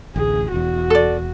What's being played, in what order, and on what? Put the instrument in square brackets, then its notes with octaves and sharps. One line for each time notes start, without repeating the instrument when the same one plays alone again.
[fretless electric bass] A1 D2 [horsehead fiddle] G#4
[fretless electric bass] E1 E2 [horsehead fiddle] F#4
[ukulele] A4 D5